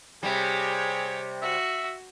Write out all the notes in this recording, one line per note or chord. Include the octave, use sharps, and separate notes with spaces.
C3 G3 G4 G#4 C#5
F#4 E5